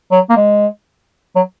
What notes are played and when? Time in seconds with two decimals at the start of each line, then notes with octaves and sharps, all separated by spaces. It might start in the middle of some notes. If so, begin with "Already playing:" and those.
0.12 F#3
0.30 A#3
0.37 G#3
1.36 F#3